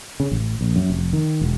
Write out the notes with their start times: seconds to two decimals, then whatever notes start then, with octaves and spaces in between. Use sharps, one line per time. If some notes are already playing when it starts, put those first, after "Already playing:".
0.20 C#3
0.31 A1
0.61 A#1
0.76 F#2
0.90 F1
1.13 D#3
1.41 E1